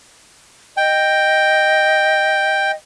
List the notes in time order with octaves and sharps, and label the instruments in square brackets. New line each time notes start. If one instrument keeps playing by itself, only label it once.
[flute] D#5 [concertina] G5